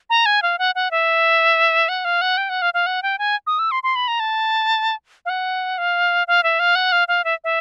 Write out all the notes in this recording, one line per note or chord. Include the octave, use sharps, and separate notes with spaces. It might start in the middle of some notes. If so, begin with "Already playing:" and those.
A#5
G#5
F5
F#5
F#5
E5
F#5
F5
F#5
G5
F#5
F5
F5
F#5
G5
G#5
D#6
E6
C6
C6
B5
A#5
A5
F5
F#5
F5
F5
E5
F5
F#5
F5
F5
E5
E5